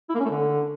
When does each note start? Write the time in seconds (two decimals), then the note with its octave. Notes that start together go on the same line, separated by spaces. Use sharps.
0.09 E4
0.15 A#3
0.20 C#4
0.25 A3
0.30 D3